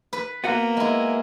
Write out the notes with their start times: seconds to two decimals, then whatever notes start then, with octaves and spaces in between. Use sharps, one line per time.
0.13 B4
0.44 A#3 B3 F#4 F#5
0.77 G#3 E4